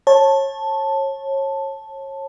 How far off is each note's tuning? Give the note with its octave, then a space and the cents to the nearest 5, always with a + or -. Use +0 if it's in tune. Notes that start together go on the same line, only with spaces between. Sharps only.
C#5 -30 A5 +0